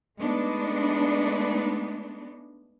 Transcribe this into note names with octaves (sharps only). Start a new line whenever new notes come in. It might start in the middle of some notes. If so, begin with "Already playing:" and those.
G#3 A3 B3 D4 D#4